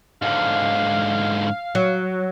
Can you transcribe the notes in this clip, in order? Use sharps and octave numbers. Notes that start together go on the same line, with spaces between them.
G#2 D3 F5
F#3